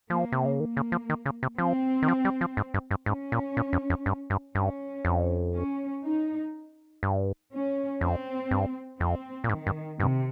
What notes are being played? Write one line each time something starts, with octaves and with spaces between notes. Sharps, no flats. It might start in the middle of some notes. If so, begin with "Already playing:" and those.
F3 A#3
C3
C#3
D#3 A#3
C#3
F3
D#3
C#3
C3
F3 C4
D#3
F3
G3
F3
G#2
G2
G2
G#2 C#4
A#2
A#2
F2
F2
G2
G2
G2 C#4
F2
C#4
D#4
G2
C#4
F2 C4
G2
F2 C4
A#2
G#2 D#3
G2
G2 C3